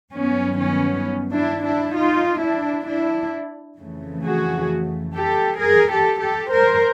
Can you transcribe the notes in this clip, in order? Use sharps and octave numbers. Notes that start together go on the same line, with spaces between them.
G2 D#3 F#3 B3 C#4
B3 C#4
D4 E4
D4 E4
D#4 F4
D4 E4
D4 E4
F2 C#3 E3 A3
F#4 G#4
G4 A4
G#4 A#4
G4 A4
G4 A4
A#4 C5